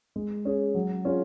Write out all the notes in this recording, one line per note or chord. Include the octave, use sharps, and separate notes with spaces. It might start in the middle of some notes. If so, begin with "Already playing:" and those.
G#3
C#4 G#4
F#3
C#4 F4 G#4